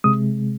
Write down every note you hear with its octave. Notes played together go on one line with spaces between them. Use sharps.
C3 G#3 D#6